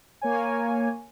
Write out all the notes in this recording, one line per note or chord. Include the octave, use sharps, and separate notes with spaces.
A#3 C#5 G#5